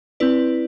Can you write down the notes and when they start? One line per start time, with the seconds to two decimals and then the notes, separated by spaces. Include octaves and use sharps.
0.20 C4 E4 B4 D5